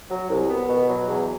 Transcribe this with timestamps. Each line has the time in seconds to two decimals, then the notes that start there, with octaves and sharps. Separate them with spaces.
0.10 F#3
0.30 C2
0.49 B3
0.69 B2
0.89 F#3
1.08 E2